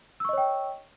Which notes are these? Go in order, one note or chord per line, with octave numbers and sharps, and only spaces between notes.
C#5 D#5 G5 C#6 E6